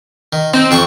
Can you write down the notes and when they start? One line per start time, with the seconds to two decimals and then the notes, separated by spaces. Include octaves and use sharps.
0.33 D#3
0.54 C4 D#4
0.71 F2 G5 C#6